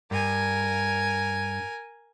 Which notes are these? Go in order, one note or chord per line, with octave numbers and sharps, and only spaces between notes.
G2 A#4 G#5